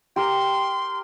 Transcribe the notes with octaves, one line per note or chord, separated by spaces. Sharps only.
G4 A#4 C6